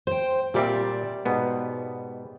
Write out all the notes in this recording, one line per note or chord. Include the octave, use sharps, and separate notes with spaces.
C5 G5
A#2 G3 C4 G4 D5 E5
G#2 B2 B3